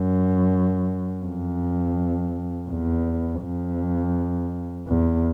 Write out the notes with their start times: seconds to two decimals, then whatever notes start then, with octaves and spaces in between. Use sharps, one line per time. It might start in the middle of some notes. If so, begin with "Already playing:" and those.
Already playing: F#2
1.25 F2
2.70 E2
3.43 F2
4.88 E2